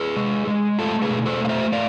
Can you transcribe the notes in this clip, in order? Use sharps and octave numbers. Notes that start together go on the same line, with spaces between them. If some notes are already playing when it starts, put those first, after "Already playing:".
Already playing: G#4 B4
G#3
G#3
A3 F4 A4
G#4 B4
B2
A4 C5
A3 F5
C5 E5
A3 D5 F5